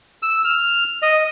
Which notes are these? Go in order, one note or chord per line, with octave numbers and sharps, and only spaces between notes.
E6
F6
D#5